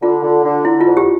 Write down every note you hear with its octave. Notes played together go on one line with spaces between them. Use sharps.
D3 F4
D3
D3
D3 E4
F4
F2
G4